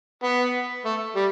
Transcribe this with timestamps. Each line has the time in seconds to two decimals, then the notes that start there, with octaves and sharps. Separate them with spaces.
0.24 B3
0.85 A3
1.16 G3